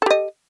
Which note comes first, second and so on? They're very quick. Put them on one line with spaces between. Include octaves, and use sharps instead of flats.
A4 G4 D#5